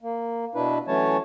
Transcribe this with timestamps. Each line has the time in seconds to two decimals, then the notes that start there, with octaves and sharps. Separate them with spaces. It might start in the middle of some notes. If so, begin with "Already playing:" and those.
0.01 A#3
0.55 B2 D4 E4 B4
0.88 E3 F#3 A3 C#4 C#5 A5